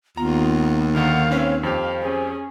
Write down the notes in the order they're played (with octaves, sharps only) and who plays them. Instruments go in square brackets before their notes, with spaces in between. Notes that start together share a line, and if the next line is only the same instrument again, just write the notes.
[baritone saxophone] D#2 [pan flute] B3 [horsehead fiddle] F4 [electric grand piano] A#5
[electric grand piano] D3 D#3 [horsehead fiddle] F5 [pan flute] F#5
[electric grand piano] C4 C#4 B4 [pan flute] C#5
[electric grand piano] F2 G4 [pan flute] C5 [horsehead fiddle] F5
[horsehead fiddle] C#4 G#4